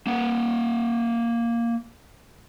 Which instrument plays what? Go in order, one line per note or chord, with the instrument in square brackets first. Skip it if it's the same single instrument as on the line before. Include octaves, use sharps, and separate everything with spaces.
[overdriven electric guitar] A#3 F#5